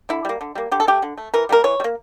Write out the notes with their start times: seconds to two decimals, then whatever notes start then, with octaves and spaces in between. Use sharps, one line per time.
0.09 D3 E4
0.25 G3 A#3
0.41 D3
0.55 G3 A#3
0.72 D3 G4
0.80 A4
0.87 A3 G4
1.02 D3
1.18 A3
1.34 E3 A#4
1.49 G3 A#3 A#4
1.64 E3 C#5
1.80 G3
1.84 A#3